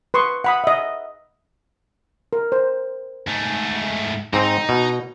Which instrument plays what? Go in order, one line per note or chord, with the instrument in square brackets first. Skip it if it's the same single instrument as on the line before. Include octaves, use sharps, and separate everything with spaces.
[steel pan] B4 C6 C#6 D#6
F#5 B5 D#6
D#5 E5
A#4
C5
[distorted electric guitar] G#2 A3
[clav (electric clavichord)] G#2 C4 [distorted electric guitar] D#4
[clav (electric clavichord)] B2